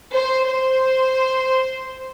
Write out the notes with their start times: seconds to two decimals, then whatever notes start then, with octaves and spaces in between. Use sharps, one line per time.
0.13 C5
0.45 C5